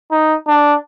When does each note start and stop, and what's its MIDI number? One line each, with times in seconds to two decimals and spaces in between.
0.11 0.35 63
0.47 0.76 62